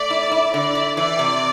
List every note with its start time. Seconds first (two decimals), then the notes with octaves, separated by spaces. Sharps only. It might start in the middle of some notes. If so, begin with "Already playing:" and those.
Already playing: A3 D5
0.10 E4
0.32 E4
0.54 D3 D5
0.75 E4
0.97 E3 D5
1.19 C3